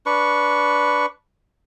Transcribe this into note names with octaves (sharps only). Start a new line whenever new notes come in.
D4 B4 C#6